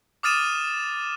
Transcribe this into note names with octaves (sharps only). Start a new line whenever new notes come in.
D6 D#6 F6 A6 D#7 E7